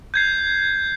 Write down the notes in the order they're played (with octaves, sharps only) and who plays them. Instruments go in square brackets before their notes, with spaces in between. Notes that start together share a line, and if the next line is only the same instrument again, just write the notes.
[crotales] G6 G#6 C7